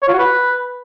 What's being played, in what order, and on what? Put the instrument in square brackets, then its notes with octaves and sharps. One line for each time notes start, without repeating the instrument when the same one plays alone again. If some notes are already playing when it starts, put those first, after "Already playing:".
[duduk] C#5
F4
F#4
B4